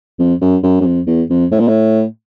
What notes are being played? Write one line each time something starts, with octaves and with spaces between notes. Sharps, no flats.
F2
F#2
F#2
F#2
F2
E2
F2
A2
A#2
A2